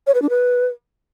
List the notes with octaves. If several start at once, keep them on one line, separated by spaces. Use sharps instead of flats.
C#5
B4
D4
B4